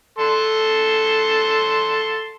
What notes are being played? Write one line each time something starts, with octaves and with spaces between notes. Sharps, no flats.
A4 C6